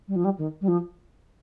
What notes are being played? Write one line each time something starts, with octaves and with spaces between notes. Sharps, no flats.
G3
F3
G3
D#3
G3
F3